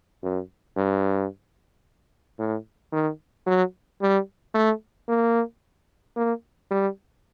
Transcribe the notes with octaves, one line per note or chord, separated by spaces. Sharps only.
F#2
G2
A2
D#3
F#3
G3
A3
A#3
A#3
G3